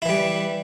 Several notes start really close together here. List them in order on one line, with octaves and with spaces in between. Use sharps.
E4 E3 G3